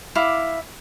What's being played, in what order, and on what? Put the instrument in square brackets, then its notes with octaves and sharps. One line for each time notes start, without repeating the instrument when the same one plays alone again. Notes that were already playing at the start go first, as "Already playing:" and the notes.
[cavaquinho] E4 F5 D6